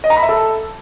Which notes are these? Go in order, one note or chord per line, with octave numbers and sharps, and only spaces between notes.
D#5
A#5
B5
E5
A4